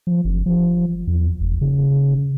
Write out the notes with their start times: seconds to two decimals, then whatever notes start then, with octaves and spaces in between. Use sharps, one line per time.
0.07 F3
0.25 F#1
0.46 F3
1.07 E2
1.41 F1
1.61 C#3